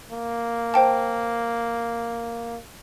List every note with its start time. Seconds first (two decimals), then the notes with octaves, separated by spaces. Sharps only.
0.11 A#3
0.74 C5 G5 A5